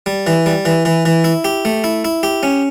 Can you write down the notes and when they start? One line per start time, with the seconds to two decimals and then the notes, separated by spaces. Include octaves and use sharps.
0.06 G3
0.27 E3
0.46 G3
0.65 E3
0.85 E3
1.05 E3
1.24 E4
1.44 G4
1.65 A3
1.84 E4
2.05 E4
2.23 G4
2.43 C#4